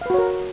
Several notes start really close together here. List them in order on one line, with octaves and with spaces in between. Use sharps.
F5 B4 F#4 C#5 A#4